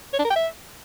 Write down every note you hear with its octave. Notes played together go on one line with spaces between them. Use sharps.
C#5
D4
A#4
G5
E5